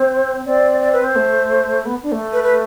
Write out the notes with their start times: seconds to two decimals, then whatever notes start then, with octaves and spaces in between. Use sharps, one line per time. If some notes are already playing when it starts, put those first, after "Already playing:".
Already playing: C4 C5
0.46 C4 D5
0.81 D5
0.93 B4
1.04 C5
1.16 A3
1.85 B3
2.03 D4
2.12 A3
2.33 B4
2.43 B4